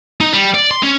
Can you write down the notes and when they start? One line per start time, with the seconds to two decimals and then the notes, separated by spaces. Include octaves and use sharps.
0.21 D#4
0.33 G3
0.54 D5
0.71 C6
0.83 C#4